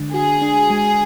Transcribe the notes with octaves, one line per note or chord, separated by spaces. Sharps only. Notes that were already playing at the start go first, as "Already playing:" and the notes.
Already playing: D3 G#3 D4
F#4 G#4
D4
G#3